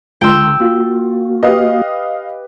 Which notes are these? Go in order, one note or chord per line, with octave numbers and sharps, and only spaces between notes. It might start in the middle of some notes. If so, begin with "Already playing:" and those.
C#2 D3 G5 C6 E6
A#3 F4 F#4
G4 B4 D#5 F5